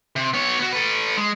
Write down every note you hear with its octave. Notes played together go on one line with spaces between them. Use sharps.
C3
B3 C#5
B3 F#4
A4 B4
G#3